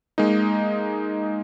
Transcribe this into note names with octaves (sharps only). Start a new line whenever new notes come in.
G#3 A#3 D#4